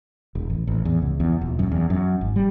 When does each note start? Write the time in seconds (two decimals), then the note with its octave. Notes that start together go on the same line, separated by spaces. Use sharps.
0.35 E1
0.50 A1
0.67 A1
0.85 E2
1.02 C#2
1.20 E2
1.41 D#1
1.59 F#2
1.72 E2
1.90 F#2
2.21 G#1
2.36 G3